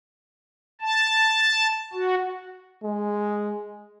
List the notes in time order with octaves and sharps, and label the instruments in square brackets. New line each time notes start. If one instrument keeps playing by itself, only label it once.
[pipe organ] A5
F#4
[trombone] G#3